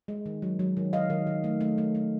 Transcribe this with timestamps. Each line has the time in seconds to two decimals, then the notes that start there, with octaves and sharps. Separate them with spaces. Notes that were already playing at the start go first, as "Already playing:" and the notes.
0.08 G#3
0.26 D#3
0.42 F#3
0.59 F#3
0.77 D#3
0.93 D#3 D#5 F5
1.10 D#3
1.27 D#3
1.44 A3
1.61 A3
1.78 A3
1.95 A3